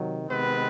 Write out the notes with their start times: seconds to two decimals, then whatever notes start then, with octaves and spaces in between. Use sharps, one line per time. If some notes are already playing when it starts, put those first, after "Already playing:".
Already playing: C3 D#3 F#3
0.29 C3 D#3 G#3 B3 C4 B4